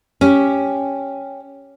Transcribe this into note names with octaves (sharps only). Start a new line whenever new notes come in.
C#4 G4